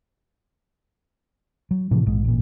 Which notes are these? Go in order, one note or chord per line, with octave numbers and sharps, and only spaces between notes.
F#3
A2 C3 E3 F3
A#1 G#2
A1 A#2